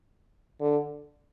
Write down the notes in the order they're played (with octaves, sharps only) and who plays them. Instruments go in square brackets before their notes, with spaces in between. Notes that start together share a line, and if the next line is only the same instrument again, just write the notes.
[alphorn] D3